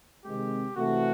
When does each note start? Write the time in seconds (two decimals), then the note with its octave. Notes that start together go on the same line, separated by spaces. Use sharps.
0.24 C3 D#3 G#3 C4 G4
0.76 C3 E3 A3 F#4